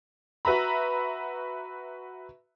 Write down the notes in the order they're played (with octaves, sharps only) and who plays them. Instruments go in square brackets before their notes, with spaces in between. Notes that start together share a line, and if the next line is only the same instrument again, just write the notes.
[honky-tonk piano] F#4 B4 E5 A#5 B5